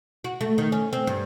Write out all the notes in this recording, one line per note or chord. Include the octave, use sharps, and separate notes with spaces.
F#4
A3
D#3
C#4
C4
G2